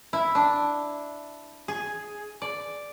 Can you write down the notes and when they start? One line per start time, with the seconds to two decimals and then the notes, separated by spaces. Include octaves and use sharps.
0.13 E4
0.35 D4
1.68 G#4
2.42 D5